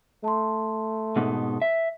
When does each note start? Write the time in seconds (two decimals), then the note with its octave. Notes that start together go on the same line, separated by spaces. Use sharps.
0.24 A3 A5 C6
1.16 G#2 B2 D#4
1.62 E5